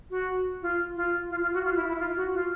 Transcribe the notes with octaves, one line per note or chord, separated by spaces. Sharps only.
F#4
F4
F4
F4
F4
F#4
F4
E4
E4
F4
F#4
F4